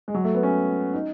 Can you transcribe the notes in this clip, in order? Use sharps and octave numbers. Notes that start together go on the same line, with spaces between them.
G#3
F#3
A3
B3
C#4
D#4